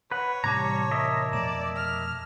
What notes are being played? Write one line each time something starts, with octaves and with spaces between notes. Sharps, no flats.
B4 C#5 F#5
A2 C3 E3 G3 A5 A#5 D6 G#6
A#4 D#5 E5
F2 B2 A3 D5 E7
F6